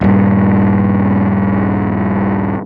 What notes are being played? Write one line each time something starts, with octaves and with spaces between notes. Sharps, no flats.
D#1 G2